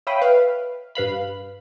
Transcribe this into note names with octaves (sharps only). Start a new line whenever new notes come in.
C#5 E5 F5 G5 B5 D#6
B4 F5
G2 B4 F5 B5